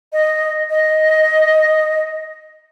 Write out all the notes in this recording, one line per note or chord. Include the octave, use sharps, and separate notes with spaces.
D#5
D#5